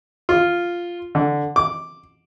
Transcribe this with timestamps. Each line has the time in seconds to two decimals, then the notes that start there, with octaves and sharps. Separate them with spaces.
0.29 F4
1.15 D3
1.56 D6